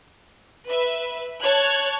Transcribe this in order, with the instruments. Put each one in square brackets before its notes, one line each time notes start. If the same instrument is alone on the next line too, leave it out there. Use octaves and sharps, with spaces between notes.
[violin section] B4 E5
C#5 A5 F#6 G#6